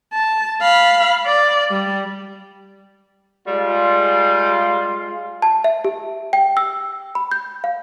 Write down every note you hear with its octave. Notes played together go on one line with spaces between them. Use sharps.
A5
F5 B5
D5
G3
G3 G#3 F4
A5
E5
G4
G5
E6
B5
G6
F5